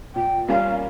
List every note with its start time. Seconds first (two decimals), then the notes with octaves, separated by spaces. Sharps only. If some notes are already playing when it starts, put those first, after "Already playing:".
0.15 A#2 G5
0.48 G3 A#3 C#4 F4 F5